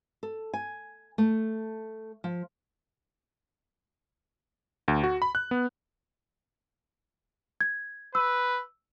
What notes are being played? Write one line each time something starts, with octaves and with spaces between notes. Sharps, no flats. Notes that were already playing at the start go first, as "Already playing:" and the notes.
A4
G#5
A3
F3
D2
F#4
B5
F#6
B3
G#6
B4 E6